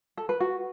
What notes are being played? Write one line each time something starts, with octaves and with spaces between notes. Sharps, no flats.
A4
B4
F#4